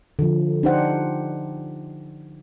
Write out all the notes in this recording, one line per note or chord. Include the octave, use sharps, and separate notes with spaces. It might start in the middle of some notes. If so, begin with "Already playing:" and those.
D3 F3
D4 D#4 G4 C5 F#5